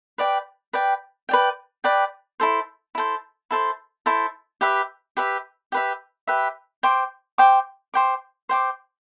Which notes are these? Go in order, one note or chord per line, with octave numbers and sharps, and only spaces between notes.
B4 D5 G5
B4 D5 G5
B4 D5 G5
B4 D5 G5
E4 A4 C5
E4 A4 C5
E4 A4 C5
E4 A4 C5
G4 B4 E5
G4 B4 E5
G4 B4 E5
G4 B4 E5
C5 G5 D6
C5 G5 D6
C5 G5 D6
C5 G5 D6